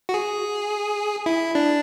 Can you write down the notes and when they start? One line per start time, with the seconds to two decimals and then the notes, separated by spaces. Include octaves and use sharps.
0.09 F#4
0.14 G#4
1.26 E4
1.55 D4